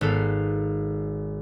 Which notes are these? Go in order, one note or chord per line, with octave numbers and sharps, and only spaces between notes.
G#1 B3 A4 F5